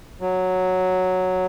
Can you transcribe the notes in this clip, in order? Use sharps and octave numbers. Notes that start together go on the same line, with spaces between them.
F#3